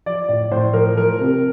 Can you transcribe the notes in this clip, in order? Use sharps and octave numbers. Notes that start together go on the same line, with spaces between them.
F3 D5
A2 D5
A2 C5
F3 A#4
F3 A#4
C3